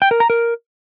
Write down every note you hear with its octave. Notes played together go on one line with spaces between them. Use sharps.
G5
A#4
A#5
A#4